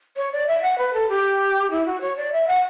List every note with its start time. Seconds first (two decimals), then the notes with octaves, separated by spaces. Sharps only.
0.17 C#5
0.32 D5
0.47 E5
0.62 F#5
0.78 B4
0.94 A4
1.09 G4
1.71 E4
1.86 F#4
2.01 C#5
2.16 D5
2.32 E5
2.48 F#5